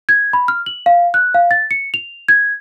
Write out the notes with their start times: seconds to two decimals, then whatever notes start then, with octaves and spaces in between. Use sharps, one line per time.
0.09 G#6
0.33 B5
0.48 F6
0.66 F#7
0.86 F5
1.14 F#6
1.34 F5
1.51 A6
1.71 C#7
1.94 F7
2.28 G#6